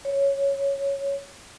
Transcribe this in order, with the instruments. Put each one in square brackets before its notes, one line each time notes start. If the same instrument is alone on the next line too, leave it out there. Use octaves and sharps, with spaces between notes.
[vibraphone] C#5